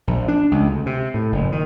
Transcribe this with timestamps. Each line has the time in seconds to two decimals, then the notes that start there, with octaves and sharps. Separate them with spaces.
0.07 A#1
0.28 D4
0.51 C#2
0.67 D2
0.86 C3
1.14 A2
1.32 F#1
1.52 D#3